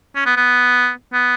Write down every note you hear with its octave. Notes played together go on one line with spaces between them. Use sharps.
C#4
B3
B3
B3